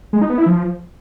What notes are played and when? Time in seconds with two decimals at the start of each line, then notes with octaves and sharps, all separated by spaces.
0.13 G#3
0.21 D#4
0.30 B3
0.38 E4
0.46 F3